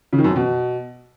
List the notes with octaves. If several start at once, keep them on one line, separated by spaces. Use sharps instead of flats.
C#3
D#3
F#2
F2
B2